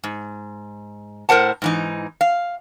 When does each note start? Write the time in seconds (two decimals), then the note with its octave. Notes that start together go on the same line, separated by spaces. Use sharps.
0.04 G#2
1.29 A2 A#4 C5 F#5 A5
1.62 G#2 E3 D#4
2.21 F5